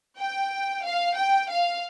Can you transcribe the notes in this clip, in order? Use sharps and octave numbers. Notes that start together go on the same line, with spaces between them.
G5
F5
G5
F5